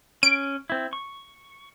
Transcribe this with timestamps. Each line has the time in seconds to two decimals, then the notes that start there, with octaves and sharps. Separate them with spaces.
0.23 C#4 D7
0.70 C4 E4
0.93 C#6